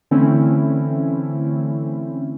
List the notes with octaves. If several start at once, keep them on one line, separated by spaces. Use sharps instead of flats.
D3 E3 A3 C4 C#4 E4